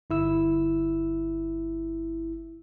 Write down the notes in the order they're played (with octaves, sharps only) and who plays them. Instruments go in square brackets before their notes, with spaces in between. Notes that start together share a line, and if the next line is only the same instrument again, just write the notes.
[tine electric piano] G1 E4 E6